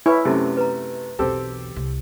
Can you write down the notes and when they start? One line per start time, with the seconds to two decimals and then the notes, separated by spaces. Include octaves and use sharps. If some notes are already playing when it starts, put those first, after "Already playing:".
0.06 E4 B4 C#5 G#5 C#6
0.25 F#2 C3 A3
0.57 B4 A#5
1.19 B1 E2 C4 G4 A4
1.76 C2